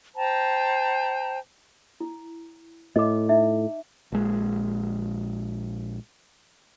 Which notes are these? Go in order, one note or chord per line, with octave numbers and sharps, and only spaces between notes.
C5 G5 A5 A#5
E4
A2 D#5 D6
D#4 E5
A#1 G#3